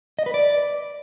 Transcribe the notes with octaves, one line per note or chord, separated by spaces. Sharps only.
D#5
B4
D5